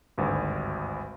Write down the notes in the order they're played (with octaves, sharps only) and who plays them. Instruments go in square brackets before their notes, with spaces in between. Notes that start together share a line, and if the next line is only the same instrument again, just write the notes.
[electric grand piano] G#1 D2 G2